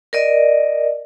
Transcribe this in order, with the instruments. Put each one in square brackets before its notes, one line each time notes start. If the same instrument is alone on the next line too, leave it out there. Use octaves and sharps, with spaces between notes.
[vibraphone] A#4 D5 D#5